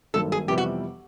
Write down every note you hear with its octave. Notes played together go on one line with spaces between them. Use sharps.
G#1 G2 D#3 F#3 A#3 A4
G#4
F2 C3 E3 G3 B3 G4
F#4